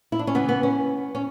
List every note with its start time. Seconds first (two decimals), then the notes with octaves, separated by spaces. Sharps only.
0.12 E4
0.19 D4
0.27 C#4
0.35 C#3 E3 B3
0.49 B3
0.63 C#4
1.15 C#4